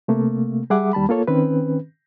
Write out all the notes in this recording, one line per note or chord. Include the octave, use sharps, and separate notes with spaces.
C3 A3 A#3
G3 G#4 E5 F#5 D6
D#2 G3 A5 B5
A#3 F4 A4 C#5
D#3 C4 C#4 B4